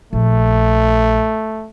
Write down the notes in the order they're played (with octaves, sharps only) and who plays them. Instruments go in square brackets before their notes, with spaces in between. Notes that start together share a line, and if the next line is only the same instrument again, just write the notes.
[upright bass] A#1 [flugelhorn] A3